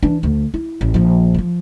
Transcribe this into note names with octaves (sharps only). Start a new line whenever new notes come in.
E3 D4
D2
E4
A1
A#1 F3
E3 F3